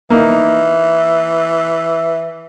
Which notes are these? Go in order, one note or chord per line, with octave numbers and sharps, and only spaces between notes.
E3 A#3 D#4